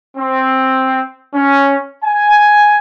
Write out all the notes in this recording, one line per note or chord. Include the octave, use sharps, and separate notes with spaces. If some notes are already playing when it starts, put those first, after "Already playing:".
C4
C#4
G#5